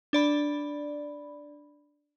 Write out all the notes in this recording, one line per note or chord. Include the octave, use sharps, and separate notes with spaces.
D4 D5 B5